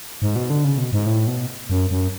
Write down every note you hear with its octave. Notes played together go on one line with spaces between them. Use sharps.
G#2
B2
D3
C#3
B2
G#2
A2
B2
F#2
F#2